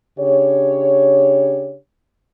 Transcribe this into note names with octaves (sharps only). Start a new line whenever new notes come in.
C#3 D4 G4 C#5